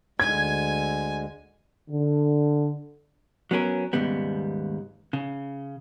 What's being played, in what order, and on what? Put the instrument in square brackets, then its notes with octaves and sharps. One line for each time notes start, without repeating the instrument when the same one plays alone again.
[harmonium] D2 D3 G#3 [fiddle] G#5 [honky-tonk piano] G#6
[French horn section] D3
[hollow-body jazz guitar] F#3 B3 C#4 A#4
D#2 G#2 C#3 G3 B3
C#3